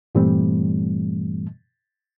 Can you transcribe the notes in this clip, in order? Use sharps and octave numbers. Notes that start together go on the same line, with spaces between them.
G2 A#2 E3 G3 A3 C4